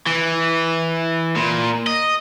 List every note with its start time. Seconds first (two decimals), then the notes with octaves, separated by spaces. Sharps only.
0.07 E3
1.36 A#2
1.87 D#5